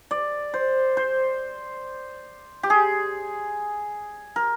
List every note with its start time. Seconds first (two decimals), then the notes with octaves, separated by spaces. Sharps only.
0.11 D5
0.54 C5
0.97 C5
2.63 G4
2.70 G#4
4.36 A#4